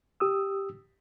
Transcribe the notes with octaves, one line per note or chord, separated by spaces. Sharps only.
G4 D#6 E6